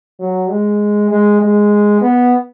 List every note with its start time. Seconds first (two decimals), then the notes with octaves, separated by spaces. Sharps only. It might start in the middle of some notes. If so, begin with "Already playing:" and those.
0.20 F#3
0.50 G#3
1.11 G#3
1.41 G#3
2.01 B3